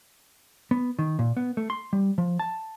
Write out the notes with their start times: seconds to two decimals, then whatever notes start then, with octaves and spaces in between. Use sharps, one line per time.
0.71 B3
0.99 D#3
1.19 A#2
1.37 B3
1.57 A3
1.70 C6
1.93 G3
2.18 F3
2.39 A5